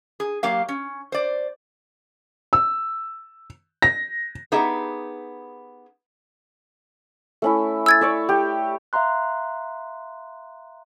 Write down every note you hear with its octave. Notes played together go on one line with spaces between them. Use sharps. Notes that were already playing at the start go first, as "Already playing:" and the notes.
G#4
F#3 A#3 G4 F5
C#4
C5 D5
E6
A#6
B3 D#4 G4 G#4 E5
A3 C#4 E4
E6 G#6 A6
C#5 D5 E5
G4
E5 F5 A#5 C6 F#6